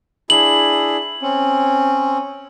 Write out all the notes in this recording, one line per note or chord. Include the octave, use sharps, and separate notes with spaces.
D4 E4 G#4 F#7
C4 C#4